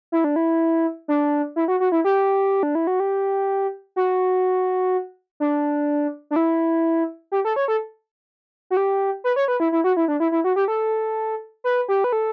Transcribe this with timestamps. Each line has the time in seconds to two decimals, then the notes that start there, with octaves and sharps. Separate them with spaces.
0.12 E4
0.24 D4
0.36 E4
1.08 D4
1.56 E4
1.68 F#4
1.80 F#4
1.92 E4
2.04 G4
2.63 D4
2.75 E4
2.87 F#4
3.00 G4
3.96 F#4
5.40 D4
6.31 D4
6.36 E4
7.32 G4
7.45 A4
7.56 C#5
7.68 A4
8.70 F#4
8.77 G4
9.24 B4
9.36 C#5
9.48 B4
9.60 E4
9.72 E4
9.84 F#4
9.97 E4
10.08 D4
10.20 E4
10.32 E4
10.44 F#4
10.56 G4
10.68 A4
11.64 B4
11.88 G4
12.04 B4
12.13 A4